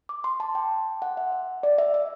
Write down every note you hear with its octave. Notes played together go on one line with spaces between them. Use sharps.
D6
C6
A5
G5
F#5
E5
E5
D5
E5
E5